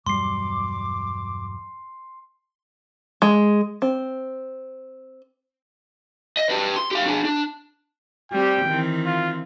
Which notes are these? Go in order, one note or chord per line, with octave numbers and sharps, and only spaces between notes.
E1 G2 F#3 G3 C6 D6 C7
G#3
C4
D#5
G4 B4
C6
G4 F5
D4 G#4
D4
G3 C4 G4 G5
D#3 E3 C4
F4